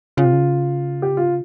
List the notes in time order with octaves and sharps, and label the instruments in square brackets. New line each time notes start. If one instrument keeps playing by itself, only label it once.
[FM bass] C#3 [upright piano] F4
[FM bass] C3
C#3
[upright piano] G4
F4